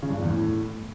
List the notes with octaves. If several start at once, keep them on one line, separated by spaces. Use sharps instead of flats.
C#3
G2
A#2
E2
A2